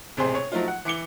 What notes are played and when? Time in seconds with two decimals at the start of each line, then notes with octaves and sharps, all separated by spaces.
0.17 E1 A1 C3 C4 G#4 C6
0.35 C#5
0.52 F3 F#3 A3 D#4 F4
0.68 F#5
0.85 E3 D6 C#7 G7